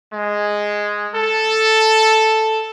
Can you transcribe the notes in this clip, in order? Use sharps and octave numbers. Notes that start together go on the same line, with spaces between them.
G#3
A4